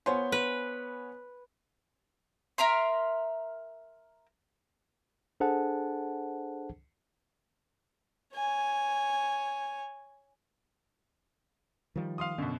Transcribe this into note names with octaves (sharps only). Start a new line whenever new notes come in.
B3 F4 C5 C#5 G#5
B4
A#4 E5 A#5 C6
D4 G#4 A4 C5 F#5 A5
C#5 G#5
D#3 F3 G3
F5 C6 D#6
F#2 B2 D3